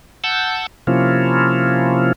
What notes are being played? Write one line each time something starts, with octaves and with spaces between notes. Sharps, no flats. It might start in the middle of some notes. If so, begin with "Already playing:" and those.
F#5 A5 E6 G6
C3 F3 A#3 C#4 E4 F4